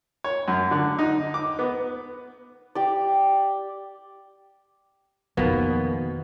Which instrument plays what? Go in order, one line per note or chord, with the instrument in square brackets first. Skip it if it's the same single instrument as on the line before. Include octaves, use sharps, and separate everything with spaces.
[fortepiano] C#5
F#2
D3
D#4
D6
B3
[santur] G4 D5
[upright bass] F2 D#3 [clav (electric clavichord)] B2 A#3 B3